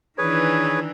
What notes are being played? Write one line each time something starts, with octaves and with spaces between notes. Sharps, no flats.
D#3 E3 D4 G#4 B4 C#5